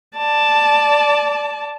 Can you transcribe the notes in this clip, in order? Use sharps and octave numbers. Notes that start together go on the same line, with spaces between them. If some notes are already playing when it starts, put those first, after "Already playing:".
D5 A5